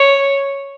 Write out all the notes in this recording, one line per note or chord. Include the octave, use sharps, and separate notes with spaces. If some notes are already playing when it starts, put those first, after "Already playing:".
Already playing: C#5